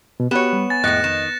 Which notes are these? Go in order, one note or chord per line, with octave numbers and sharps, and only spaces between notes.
B2
B3 F#4 G4 C#5 E7
G3
G#5 A6
F2 A2 G#3 D#5 F#6 A#6 C#7
D#3 E7